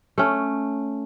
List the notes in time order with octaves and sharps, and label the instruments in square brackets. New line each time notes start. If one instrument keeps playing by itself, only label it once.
[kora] A3 C#4